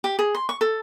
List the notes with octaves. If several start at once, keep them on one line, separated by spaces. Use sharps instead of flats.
G4
G#4
C6
C#6
A4